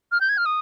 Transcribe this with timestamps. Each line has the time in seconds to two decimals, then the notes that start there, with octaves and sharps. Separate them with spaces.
0.12 F6
0.21 G6
0.29 G#6
0.38 F6
0.46 D#6